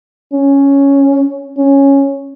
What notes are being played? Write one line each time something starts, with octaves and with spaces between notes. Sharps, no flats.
C#4
C#4